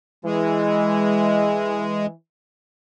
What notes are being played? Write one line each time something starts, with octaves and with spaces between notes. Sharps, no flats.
E3 G#3